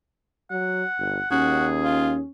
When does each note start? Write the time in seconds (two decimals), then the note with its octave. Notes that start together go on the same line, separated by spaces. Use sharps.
0.51 F#3 F#5
0.98 G1
1.31 D#2 C#4 F#4 G#4
1.83 F4